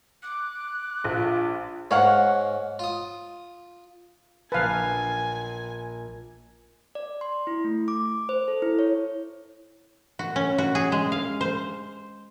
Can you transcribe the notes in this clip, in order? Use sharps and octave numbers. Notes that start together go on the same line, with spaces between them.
D6 F#6
A#1 F4
G#2 C#5 F5 F#5
F4 D#6
A#1 B4 F5 G#5 A5
D5
C6
E4
A3
D6
C5
A4
E4
C#5
F#4
C#4
F#4
G#4
G#3
F5
C5